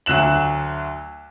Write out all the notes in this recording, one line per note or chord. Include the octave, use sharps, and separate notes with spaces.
D2 F#3 F#6 E7 F#7